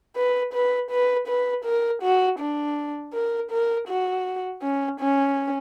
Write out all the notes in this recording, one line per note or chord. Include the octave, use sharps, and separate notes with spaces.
B4
B4
B4
B4
A#4
F#4
D4
A#4
A#4
F#4
C#4
C#4